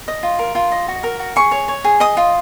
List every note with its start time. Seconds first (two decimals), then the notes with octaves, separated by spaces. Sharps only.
0.08 D#5
0.23 F4
0.39 A#4
0.55 F4
0.72 D#5
0.88 F#4
1.03 A#4
1.20 F#4
1.36 G#4 C#6
1.52 C#5
1.68 C#5
1.84 G#4
2.00 D#5 D#6
2.17 F4